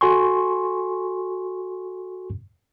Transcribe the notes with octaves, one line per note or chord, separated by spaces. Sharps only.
F#4 A4 G#5 C6 C#6